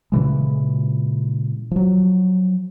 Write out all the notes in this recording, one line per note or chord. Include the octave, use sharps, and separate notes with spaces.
A#2 C#3 E3 G#3
F3 F#3